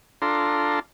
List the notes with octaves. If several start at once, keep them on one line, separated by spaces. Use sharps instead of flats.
D4 F4 A4 A#5 C6